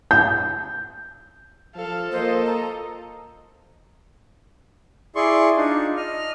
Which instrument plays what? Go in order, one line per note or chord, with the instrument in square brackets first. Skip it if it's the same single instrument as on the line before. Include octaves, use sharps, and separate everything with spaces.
[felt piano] G6
[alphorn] F3 [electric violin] A4 [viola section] F5
[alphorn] A#3 [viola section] F4 D#5 [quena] C5
[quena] A#5
[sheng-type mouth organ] E4 G#4 D5 C6 C#6
D4 D#4 F4
D#5 F6